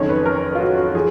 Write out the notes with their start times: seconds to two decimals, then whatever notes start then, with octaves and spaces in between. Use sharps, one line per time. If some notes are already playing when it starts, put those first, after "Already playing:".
Already playing: F#1 F2 D#3 C#5
0.09 B4
0.26 A#4
0.55 F4
0.61 F#4
0.78 F#4
0.95 F3 G#4